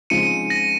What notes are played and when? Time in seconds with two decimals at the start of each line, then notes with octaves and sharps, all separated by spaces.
0.10 C#3 F3 G#3 C4 D#4 C#7 D#7
0.50 A#6